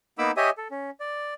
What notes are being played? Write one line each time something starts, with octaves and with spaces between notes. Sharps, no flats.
A#3 B3 D#4 B5 D6 E6
G4 C#5 D#5 E5 G#5 D#6
A4
C#4
D5